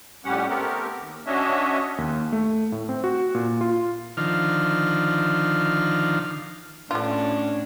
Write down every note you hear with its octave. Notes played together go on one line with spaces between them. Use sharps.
F2 A2 G3 C#4 G4 F#5
A3 B3 C4 G4 A#4
D#2
C#4 D4 F#4 C#5 D#5 E5
D#2
A3
A2
C4
F#4
A#2
F4
D3 D#3 F3 F6
A2 D3 C#4 D4 F4